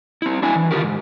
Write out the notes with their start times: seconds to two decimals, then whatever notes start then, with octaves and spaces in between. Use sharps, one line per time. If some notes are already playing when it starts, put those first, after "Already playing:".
0.22 C4 E4
0.42 D4 E4 G#5
0.55 E3
0.71 D3 F4 G4 A#4
0.84 G#2